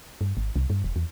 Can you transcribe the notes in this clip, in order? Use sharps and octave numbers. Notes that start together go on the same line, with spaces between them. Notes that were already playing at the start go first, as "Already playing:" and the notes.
G2
G#1
C2
G2
E1
E2